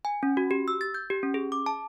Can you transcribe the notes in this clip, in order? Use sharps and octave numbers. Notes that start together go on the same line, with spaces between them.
G#5
C#4
F#4
G4
E6
A6
G6
G4
C#4
G#4
D6
A5